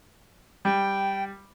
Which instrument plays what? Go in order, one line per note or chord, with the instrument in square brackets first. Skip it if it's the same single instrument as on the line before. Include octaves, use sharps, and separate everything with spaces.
[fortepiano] G3 [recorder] G5